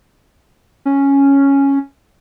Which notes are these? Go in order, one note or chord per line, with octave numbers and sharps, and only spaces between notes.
C#4